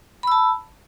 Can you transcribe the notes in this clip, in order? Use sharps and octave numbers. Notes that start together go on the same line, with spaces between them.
A5 B5 E6